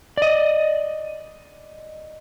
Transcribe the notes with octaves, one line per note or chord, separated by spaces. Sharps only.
D5 D#5